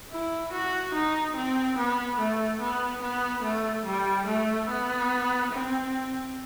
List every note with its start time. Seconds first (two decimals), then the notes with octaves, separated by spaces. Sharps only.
0.11 E4
0.52 F#4
0.94 D#4
1.35 C4
1.78 B3
2.19 A3
2.61 B3
3.02 B3
3.43 A3
3.86 G3
4.27 A3
4.69 B3
5.52 C4